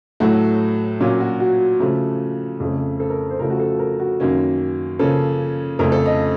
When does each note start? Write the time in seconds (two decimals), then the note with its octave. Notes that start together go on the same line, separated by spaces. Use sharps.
0.20 A2 F#3 A3 F#4
1.00 A#2 F#3 A#3 C#4 F4
1.20 F#4
1.40 F#4
1.80 C#3 F3 A3
2.60 F2 C#3 A3
3.00 A4
3.10 A#4
3.30 C5
3.39 C#3 F3 A3 A#4
3.50 F#4
3.60 A4
3.79 A#4
4.00 F#4
4.20 F#2 D#3 A#3 C#4
4.99 C#3 F3 A#3 C#4 A4
5.79 F2 C#3 A3 C#4 A#4
5.92 A4
6.06 D#5